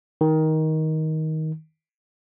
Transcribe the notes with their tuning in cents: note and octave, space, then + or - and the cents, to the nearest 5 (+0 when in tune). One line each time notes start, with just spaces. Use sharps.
D#3 +15